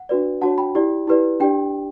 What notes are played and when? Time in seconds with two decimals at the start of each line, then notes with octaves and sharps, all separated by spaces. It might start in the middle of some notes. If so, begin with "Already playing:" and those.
Already playing: F#5
0.09 D4 F#4 B4 D5
0.41 D4 F#4 C#5 F#5 A5
0.58 G5 B5
0.75 E4 G4 D5
1.07 E4 G4 B4 D5
1.40 D4 G4 D5 G5